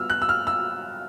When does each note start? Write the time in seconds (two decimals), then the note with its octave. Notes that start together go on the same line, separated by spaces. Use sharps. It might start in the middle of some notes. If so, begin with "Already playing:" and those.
Already playing: G3 B3 E6 F6
0.10 F#6
0.22 E6
0.29 F6
0.47 E6